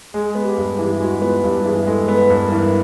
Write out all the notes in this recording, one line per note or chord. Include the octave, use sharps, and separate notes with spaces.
G#3 G#4
B3
G4
G2
G4
E3
G#3 F#4
B3 F4
G2 G4
E3 G#4
G#3 A4
B3
B4
G2
A#4
E3